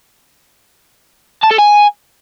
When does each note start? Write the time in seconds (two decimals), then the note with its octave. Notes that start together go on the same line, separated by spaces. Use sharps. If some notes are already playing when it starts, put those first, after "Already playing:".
1.44 A5
1.51 A4
1.59 G#5